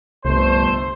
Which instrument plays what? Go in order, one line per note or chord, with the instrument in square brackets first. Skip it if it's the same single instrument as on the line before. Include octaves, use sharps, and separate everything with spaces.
[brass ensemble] G1 A3 C5 [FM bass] C2